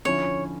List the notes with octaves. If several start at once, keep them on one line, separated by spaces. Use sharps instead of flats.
D3 F3 C#4 E4 C#5